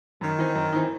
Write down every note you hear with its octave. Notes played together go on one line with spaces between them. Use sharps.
F#2 D#3
E3 C4 D#4
F#2
E3 C4 D#4